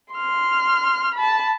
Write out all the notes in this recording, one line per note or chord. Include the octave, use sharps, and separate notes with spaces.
C6 F6
A5 B5